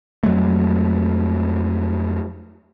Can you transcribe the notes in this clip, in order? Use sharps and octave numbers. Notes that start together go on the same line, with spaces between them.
F2 F#3 G#3 A3